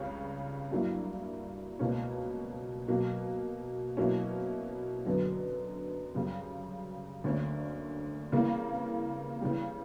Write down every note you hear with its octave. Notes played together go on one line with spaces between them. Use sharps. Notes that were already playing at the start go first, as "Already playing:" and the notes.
Already playing: C#2 C#3 G3 C#4
G2 F#3 A#3 E4
C#2 B2 A#3 C#4
B2 F#3 A#3
B2 F#3 A#3 C#4 E4
F#2 D3 F#3 B3
F#2 C#3 G3
D2 D3 A#3 C#4
C#3 E3 G3 A#3
C#3 E3 G3